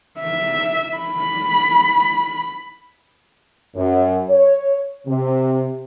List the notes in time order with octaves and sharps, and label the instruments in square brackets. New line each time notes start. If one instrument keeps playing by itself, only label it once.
[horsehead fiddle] E5
B5
[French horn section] F#2
C#5
C3